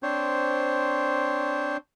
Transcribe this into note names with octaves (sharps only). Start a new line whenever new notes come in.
C4 D4 C5 C#5